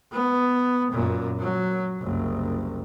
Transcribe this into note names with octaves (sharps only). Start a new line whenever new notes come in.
B3
F#2 A#2
F#3
F#1 C2